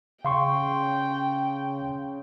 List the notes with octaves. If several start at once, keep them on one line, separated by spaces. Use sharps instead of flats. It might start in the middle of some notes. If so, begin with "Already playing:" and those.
C#3 F5 G5 C6 C#6